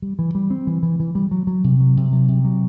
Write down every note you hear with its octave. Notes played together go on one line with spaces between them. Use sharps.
G3
E3
G3
C4
E3
E3
E3
G3
F#3
F#3
C3
F#3
C3
F#3
C3
F#3